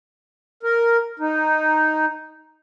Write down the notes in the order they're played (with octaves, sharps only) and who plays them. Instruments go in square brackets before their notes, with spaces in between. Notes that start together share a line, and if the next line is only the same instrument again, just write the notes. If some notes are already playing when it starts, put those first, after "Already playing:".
[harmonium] A#4
D#4